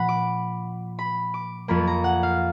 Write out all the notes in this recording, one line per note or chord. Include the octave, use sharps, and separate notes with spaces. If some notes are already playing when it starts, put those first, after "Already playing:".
Already playing: A#2 F3 F#5 B5
D6
B5
D6
F2 F3 A#3 B5
A#5
F#5
F5